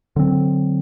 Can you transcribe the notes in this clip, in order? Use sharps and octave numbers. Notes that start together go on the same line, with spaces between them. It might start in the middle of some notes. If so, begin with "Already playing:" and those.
D3 F#3 C4